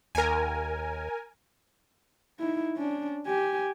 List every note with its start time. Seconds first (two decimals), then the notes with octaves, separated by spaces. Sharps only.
0.15 D#2 A#4 G#5
2.40 D#4 E4
2.76 C#4 D4
3.27 G4 G#5